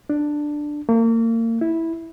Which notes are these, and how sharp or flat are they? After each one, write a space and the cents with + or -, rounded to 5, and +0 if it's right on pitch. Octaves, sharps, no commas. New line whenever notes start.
D4 +10
A#3 -35
E4 -10